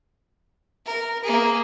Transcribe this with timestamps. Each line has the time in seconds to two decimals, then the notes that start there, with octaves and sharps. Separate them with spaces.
0.86 A#4
1.23 A#3 G#4